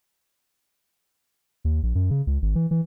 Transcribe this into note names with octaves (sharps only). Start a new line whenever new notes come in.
D#2
A#1
F#2
C#3
C#2
G#1
E3
E3